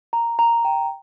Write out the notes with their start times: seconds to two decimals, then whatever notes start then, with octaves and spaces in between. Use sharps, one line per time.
0.13 A#5
0.39 A#5
0.65 G5